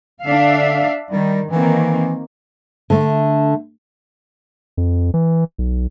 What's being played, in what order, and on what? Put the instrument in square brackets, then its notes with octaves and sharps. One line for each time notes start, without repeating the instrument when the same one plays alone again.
[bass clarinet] D3 [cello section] D4 E5 F5
[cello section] D#3 [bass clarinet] G3
[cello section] D#3 A#3 C4 [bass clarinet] E3
[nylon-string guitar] D3 A3
[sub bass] F2
E3
B1